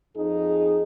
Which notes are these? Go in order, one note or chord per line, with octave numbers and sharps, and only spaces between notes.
F2 D#4 G#4